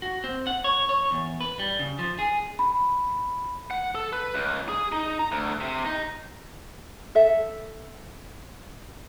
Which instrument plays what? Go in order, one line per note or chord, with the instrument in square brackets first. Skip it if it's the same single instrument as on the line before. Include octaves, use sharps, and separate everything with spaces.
[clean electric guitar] F#4
C4
F#5
C#5
C#5
E2
B4
G3
C#3
F3
G#4
[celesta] B5
[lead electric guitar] F#5
A4
B4
C#2
G#4
D#4
A#5
D2
C3
D#4
[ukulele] A4 E5